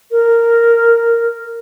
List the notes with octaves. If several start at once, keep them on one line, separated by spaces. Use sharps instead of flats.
A#4